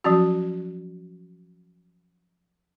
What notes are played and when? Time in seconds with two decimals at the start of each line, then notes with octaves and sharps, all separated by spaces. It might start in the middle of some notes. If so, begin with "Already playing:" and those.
0.04 F3 F#3 C#4 F#4